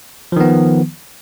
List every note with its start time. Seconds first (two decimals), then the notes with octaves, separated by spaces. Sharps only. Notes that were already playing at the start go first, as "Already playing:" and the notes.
0.32 F3
0.36 D#3
0.40 B3